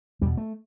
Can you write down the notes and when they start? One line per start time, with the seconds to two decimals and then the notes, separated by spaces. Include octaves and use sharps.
0.21 E2 G3
0.25 B2
0.37 A3